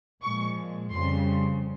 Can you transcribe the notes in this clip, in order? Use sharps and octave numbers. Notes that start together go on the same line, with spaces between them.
A#2 F3 G#3 C#6
F2 C#3 G3 C6